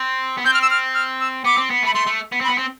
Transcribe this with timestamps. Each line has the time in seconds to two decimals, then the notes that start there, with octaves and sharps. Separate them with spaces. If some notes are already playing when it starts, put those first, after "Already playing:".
Already playing: C4
0.38 B3
0.45 C4 G6
0.54 F6
0.62 E6
0.70 F6
0.95 F6
1.21 E6
1.44 B3 D6
1.58 C4
1.70 B3
1.83 A3
1.86 B5
1.94 A3 C6
2.07 A3
2.32 B3
2.41 C4
2.44 B5
2.49 B3
2.58 C4